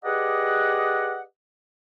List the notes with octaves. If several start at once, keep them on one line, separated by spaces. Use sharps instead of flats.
G4 G#4 B4 D5 D#5 F#5